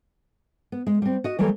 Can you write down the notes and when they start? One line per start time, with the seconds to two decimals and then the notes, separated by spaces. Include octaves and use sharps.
0.72 B3
0.87 G#3
1.02 G3 C4
1.24 F#4 D#5
1.39 E3 F#3 G3 A#3 A4